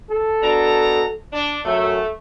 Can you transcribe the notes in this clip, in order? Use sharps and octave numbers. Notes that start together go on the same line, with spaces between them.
A4
B2 D4 A#5
D4
F#2 A3